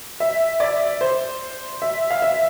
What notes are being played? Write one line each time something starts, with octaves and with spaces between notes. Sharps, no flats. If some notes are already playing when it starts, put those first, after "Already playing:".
E5
D5
C5
E5
F5
E5